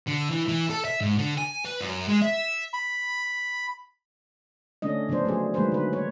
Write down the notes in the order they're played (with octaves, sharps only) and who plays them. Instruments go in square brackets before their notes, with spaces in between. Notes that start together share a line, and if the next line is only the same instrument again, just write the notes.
[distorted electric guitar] D3
E3
E3
A4
E5
G#2
D3
G#5
B4
F#2
G#3
E5
[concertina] B5
[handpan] D3 A3 C#4 D4 D#5
C#3 F3 B3 D4 C5
F#3 A3 G#4
D#3 F#3 G#3 A#3 B4 C5
D3 B4
C#5